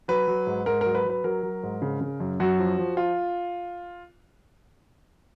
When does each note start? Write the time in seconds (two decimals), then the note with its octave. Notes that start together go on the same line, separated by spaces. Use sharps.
0.08 F#3 B4
0.27 F#3
0.47 G#2
0.66 G#2 A#4
0.81 F#3 A#4
0.95 B4
1.05 F#3
1.10 B4
1.24 F#3 A#4
1.43 F#3
1.63 G#2
1.82 C#3
2.01 C#3
2.20 F#2
2.40 F#2 F#4
2.59 F3
2.78 F3
2.97 F4